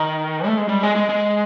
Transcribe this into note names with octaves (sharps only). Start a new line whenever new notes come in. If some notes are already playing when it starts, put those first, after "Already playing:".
Already playing: D#3
A3
G#3
G3
G#3
G#3
G#3